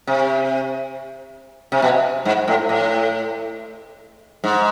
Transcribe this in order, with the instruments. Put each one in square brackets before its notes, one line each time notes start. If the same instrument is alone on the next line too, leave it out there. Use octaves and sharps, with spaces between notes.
[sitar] C3
C3
B2
G#2
A2
A2
G#2